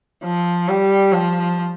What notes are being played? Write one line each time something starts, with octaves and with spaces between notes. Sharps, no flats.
F3
G3
F3